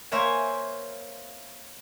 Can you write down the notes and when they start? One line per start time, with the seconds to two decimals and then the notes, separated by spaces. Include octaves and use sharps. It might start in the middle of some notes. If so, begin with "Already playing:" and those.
0.12 A#3 A#4 C5 C#5 E5 G#5